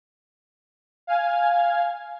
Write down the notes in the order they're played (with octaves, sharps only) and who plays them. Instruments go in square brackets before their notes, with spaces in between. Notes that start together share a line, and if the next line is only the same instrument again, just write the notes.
[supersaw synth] F5 G#5